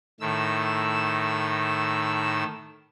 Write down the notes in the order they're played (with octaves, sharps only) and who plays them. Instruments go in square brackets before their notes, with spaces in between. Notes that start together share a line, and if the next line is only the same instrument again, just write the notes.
[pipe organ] A2 D#3 E6